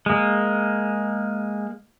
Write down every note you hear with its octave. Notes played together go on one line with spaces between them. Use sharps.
G#3 A#3